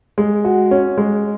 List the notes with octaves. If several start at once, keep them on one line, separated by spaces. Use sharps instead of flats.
G#3
F#4
C#4
G#3